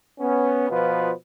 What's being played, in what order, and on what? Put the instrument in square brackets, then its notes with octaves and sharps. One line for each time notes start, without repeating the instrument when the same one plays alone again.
[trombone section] B3 C#4
B2 F3 F4 B4